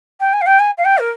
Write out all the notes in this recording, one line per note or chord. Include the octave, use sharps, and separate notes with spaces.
G5
G#5
F5
G5
G#5
F5
G5
A#4